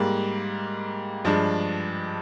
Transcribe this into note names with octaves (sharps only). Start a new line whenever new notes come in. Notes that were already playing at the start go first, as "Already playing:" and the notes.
Already playing: G#2 G3 A#3
G2 F3 G#3 D4